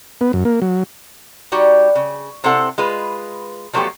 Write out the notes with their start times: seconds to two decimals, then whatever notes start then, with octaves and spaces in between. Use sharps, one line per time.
0.21 B3
0.33 F#2
0.45 A#3
0.62 F#3
1.52 G3 D#4 F#4 G4
1.95 C#3
2.44 C3 C4 E4 A4 F#5
2.78 G#3 F4 B4
3.73 F3 F#3 A3 B3 F4 G4